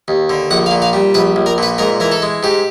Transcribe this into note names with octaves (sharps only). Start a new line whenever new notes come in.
D#2
D3
A#1 F#5
F5
A#2
F5
G3
A#1 B4
A#1
A#4
A#2 B4
G#2 A#4
E3 A#4
A4
G#3
G#2 G4